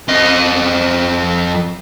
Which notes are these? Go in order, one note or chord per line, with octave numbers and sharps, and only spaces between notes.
F2 D#5